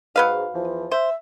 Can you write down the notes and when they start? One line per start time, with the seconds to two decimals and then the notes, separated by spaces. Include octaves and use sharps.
0.16 G#2 F#3 B4 F5
0.54 E2 E3 F3
0.92 C5 E5